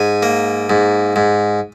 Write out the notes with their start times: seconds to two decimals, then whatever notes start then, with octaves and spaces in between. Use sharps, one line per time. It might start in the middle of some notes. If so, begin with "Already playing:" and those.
Already playing: G#2 G#5
0.23 A#3
0.70 G#2
1.16 G#2